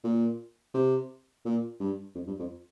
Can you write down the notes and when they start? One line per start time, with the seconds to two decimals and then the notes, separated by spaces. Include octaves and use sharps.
0.04 A#2
0.74 C3
1.45 A#2
1.80 G2
2.15 F2
2.26 G2
2.39 F2